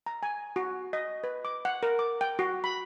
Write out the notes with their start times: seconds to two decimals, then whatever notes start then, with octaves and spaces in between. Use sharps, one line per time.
0.06 A#5
0.23 G#5
0.56 F#4
0.93 D#5
1.24 B4
1.45 D6
1.65 F#5
1.83 A#4
1.99 D6
2.21 G5
2.39 F#4
2.64 B5